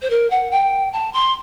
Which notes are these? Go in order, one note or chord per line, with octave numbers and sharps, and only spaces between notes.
C5
A#4
F#5
G5
A5
C6